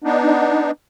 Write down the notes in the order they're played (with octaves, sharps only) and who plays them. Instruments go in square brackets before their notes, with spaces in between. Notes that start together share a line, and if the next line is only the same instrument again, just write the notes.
[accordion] B3 D4 D#4